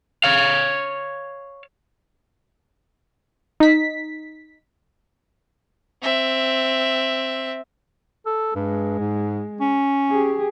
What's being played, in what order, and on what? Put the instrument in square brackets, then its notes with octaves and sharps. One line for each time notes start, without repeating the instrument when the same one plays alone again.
[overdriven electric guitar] C#5 F5
[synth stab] D#4 B6
[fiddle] C4 E5
[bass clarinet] A4
[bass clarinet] G2 [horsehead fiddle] G#3
[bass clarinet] G#2
C#4
[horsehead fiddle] G4 G#4